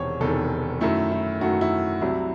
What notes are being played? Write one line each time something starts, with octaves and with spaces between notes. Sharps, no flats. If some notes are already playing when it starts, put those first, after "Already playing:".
Already playing: E1 E2 C3 D#3 C5 C#5
E1 E2 C3 D#3 A4
F#2 D#3 A3 E4
E4
F#2 D#3 A3 F#4
E4
C2 C3 F#3 E4